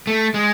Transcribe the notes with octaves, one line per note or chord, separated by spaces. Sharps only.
A3
G#3